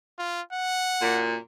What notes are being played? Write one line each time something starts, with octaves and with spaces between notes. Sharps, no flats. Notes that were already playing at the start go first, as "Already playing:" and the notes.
F4
F#5
F#2 A#2